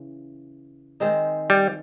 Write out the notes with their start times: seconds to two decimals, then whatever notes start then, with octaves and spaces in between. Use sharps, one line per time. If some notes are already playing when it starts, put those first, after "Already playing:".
Already playing: C#3 E3
1.00 D#3 G#3 C4 D#4
1.50 G3